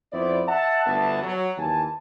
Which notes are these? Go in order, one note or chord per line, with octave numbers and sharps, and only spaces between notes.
F2 B3 E4 C5 D5
E5 F#5 A5
G1 D2 B3 E5 A5
F#3
D#2 E3 G#5 A5